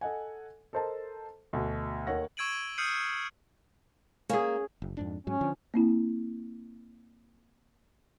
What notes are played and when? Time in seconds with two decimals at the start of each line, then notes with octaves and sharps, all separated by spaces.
0.01 A4 D#5 F#5 G#5
0.73 A4 A#4 C5 D#5 A5
1.53 D2 B2
2.07 D#2 D#3 C#5 F#5 A#6
2.37 C#6 E6 G#6 D7 D#7 F#7
2.78 D#6 F6 G6 C7 C#7 D#7
4.29 A#3 C#4 G#4
4.82 F#1
4.97 F2 G#2 D4
5.27 G#2 F#3 C#4
5.41 D3 F3
5.74 A#3 C4 E4